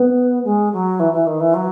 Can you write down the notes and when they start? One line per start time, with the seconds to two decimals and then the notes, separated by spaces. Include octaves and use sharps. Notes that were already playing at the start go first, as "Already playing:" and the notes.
Already playing: B3
0.44 G#3
0.72 F#3
0.99 E3
1.12 E3
1.26 D#3
1.40 E3
1.54 F#3